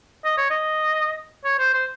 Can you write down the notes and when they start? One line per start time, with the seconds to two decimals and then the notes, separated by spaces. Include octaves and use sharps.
0.25 D#5
0.38 C#5
0.51 D#5
1.44 C#5
1.59 C5
1.74 C5